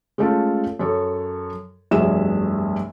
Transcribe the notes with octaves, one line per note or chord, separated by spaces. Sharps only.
G#3 A3 C#4 F4 A4
F#2 A4 C#5
F1 B1 G2 G#4 E5 E7